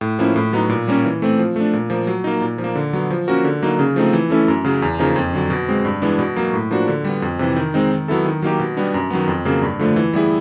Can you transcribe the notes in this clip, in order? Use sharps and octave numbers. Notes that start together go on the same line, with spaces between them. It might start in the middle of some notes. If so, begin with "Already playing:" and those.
A2
F3 A#3 C#4 E4
A2
F#3 B3 D#4
A#2
G3 A#3 C#4
E3
A3 C4
F3
A3 D4
A#2
F3 A#3
F#3
A#3 D#4
A#2
F3
A#3
D3
F#3 B3
F3
A#3 C#4 F#4 A#4
D3
F#3 A#3 D#4
C#3
F3 A3 C4 D#4
E3
A3 C#4 E4 A4
F#2
C#3 F#3
E2
C#3 F3 A#3 D#4
F2
D3 F#3
B2
G#3 C4
G2
E3 G#3 B3 D4
B2
F#3 A#3
A2
F3 A#3 D4 F#4
D3
G3 B3
F2
C3 E3
D#3
G#3 C4 D#4
D#3
F#3 B3 E4 A4
D#3
F#3 A#3 D#4 G4
B2
G3 B3 D4
F#2
D#3 F#3 B3
F2
C#3 F#3 A#3
G2
D3 F3 A3
E3
G3 B3 E4 G#4